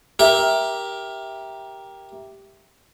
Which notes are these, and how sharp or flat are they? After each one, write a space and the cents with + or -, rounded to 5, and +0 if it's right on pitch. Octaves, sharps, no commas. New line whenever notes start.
G4 +0 A#4 +15 E5 +0